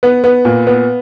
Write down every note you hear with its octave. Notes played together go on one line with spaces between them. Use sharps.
B3
B3
A#2
B3